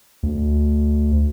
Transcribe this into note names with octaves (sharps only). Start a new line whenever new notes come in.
D2